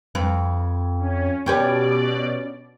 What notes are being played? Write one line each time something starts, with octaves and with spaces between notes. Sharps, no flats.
F2 B4
C#4
B2 C#4 G4 B4 D5